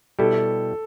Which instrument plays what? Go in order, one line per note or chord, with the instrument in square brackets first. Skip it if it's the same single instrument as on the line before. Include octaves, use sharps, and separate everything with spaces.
[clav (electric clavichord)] B2 G3 E4 G4 [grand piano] A4